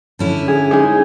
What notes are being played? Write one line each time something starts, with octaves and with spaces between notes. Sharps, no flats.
D3 C#4 E4
G#4
G#3 D#4 G#4